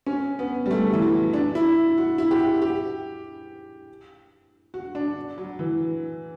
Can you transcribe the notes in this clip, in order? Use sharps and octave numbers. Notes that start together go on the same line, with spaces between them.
C#4
B3
G3
A3
E3
F#3
D4
E4
F#4
E4
G4
F#4
G4
F#4
D4
F#3
E3